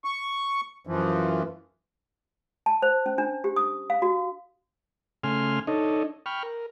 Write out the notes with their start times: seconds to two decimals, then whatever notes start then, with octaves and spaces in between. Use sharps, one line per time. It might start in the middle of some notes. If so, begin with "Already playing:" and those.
0.04 C#6
0.87 F#2 E3 F3
2.66 A5
2.82 C5
3.06 C#4
3.18 D4
3.44 G4
3.56 D#6
3.90 F5
4.02 F#4
5.23 C#3 A3 G#5 C6 F6
5.67 D4 D#4 A4 C#5 D#5
6.26 G5 B5 C#6 F6
6.43 A#4